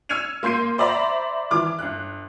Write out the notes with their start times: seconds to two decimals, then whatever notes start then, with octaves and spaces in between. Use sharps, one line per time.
0.09 E6 F6 G#6 C#7 D#7 F7
0.43 A#3 C6 G6 C7 D#7
0.78 C5 D5 E5 A#5 B5
1.51 E3 D6 F6
1.79 G1 F#6